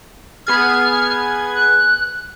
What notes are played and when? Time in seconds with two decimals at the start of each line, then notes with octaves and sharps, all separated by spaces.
0.47 B3 G#4 F6 G#6
1.55 F#6